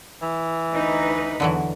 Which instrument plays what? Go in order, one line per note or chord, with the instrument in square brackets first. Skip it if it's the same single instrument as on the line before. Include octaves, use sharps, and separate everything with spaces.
[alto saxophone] E3
[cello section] D2 D#4 B4
[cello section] E2 [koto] D3 E3 F#3